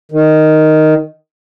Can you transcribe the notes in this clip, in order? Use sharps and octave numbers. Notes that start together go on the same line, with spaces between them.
D#3